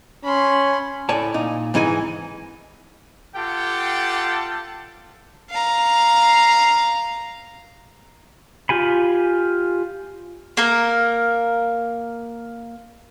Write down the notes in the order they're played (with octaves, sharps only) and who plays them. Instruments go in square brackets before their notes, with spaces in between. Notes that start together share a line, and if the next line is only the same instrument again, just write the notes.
[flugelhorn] C#4 [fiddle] B5 C6
[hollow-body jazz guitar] A2 C#5 D5 G#5 A5
A#2 D#4
G#2 E3 D#4 A4 G#5
[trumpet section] F4 G4 A4 F#5 G5 A5
[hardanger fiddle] F5 A#5
[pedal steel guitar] F4 G4 G#5 B5
[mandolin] A#3 A#4